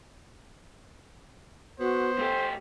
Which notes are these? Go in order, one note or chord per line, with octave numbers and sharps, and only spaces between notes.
B3 F#4 C5
A3 G4 A4